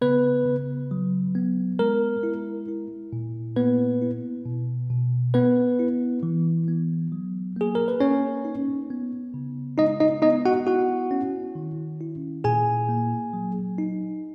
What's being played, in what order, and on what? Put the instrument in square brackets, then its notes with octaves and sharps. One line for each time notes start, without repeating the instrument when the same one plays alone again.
[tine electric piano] C#3 B3 B4
C#3
F#3
B3
G#3 A#4
E4
E4
A#2
A#3 B3 B4
E4
B2
B2
B3 B4
E4
E3
B3
F#3
A#3 G#4
A#4
B4
A#3 C#4 C#5
D#4
B3
C#3
G#3 D#4 D#5
D#4 D#5
B3 D#4 D#5
F#4 F#5
E4 F#4 F#5
C#4
D#3
E4
A#2 G#4 G#5
A#3
F#3
D#4